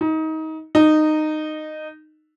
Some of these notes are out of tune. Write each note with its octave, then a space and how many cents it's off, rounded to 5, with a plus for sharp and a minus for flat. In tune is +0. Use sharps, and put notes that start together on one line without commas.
D#4 +25
D#4 -15